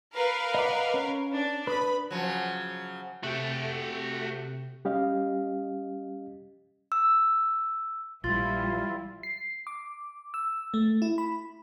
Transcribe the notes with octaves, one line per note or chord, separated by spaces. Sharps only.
A#4 B4 F5
D#5 F#5 D6
C#4
D4
B4 B5 D#6
C#3 F3 F#3
C3 A3 F#4 G5
G3 C#4 G4 D#5 F5
E6
A#1 E3 G3 E4 F4 C6 A6 G7
C7
D6
E6
A3
E4
B5